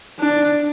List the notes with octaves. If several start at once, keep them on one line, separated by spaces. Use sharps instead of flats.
D4